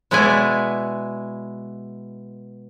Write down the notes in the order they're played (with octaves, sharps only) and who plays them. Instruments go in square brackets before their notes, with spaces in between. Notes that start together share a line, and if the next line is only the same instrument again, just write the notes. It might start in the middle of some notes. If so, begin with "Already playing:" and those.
[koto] B2 G#3 B3 E4 D5 G#5